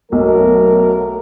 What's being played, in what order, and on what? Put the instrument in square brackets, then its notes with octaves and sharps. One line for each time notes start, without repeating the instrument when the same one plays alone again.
[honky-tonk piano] B1 [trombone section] F#3 A3 A#4